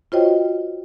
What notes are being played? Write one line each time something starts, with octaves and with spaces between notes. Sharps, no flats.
F4 F#4 C5 C#5 D#5 G5